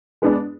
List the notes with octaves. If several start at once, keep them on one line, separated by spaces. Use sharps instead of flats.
G#3 B3 D4